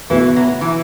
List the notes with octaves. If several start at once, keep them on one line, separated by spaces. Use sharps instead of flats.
B2 E3 B3 F#4 B4 E5
F#3
E3